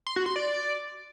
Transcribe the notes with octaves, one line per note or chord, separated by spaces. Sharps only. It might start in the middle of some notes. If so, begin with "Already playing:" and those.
C6
F#4
C6
D5